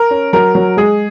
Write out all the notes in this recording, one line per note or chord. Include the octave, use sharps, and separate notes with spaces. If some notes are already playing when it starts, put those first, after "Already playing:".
Already playing: A#4
C#4
F#3 A#4
F#3
G#3 G#4